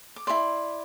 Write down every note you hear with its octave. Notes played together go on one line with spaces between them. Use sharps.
D6
E4 A4 D5 C6